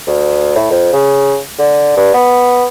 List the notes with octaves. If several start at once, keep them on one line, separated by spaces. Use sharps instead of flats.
D2
A2
F2
C#3
D3
G2
B3